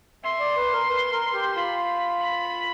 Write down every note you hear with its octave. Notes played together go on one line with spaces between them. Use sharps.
E5 C6
D5
B4
A#4
B4
A#4
G4
F4 B5
B5